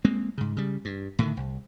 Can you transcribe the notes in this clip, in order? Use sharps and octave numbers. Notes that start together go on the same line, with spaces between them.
G#3 A#3 C4
G#2 C#3
C#3 G3
G2
A2 D3 D#3
C2